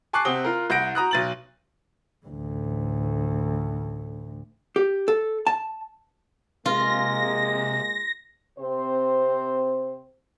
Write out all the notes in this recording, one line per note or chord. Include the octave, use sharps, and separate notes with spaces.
G#5 A5 C#6 D6 F#6 C7
C3 C4 F#5 D#6 G7
F4 A#4
C2 F#5 G6 A#6 D7
F#4 A#5 D#6 F#6
B1 A6 F#7
A1 D2
G4
A4
A5
C3 G#3 A#3 F4 A#6
C3 C4 C5